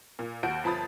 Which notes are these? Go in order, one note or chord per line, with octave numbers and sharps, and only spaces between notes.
A#2
D#2 F#4 G6 D7
G1 F3 A5 B5 D#6 A6